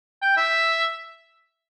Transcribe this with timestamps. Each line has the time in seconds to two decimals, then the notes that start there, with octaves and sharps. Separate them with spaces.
0.22 G5
0.37 E5